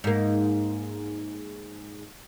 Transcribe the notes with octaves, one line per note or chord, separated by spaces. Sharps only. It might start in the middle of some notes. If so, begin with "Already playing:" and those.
G#2 A#3